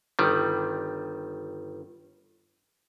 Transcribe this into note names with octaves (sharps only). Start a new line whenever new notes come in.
G1 D#3 G3